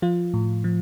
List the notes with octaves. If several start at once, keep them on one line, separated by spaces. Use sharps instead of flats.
F3 F4
A2
F3